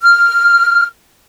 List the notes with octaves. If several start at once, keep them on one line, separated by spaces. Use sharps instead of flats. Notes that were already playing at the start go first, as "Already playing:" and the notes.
F6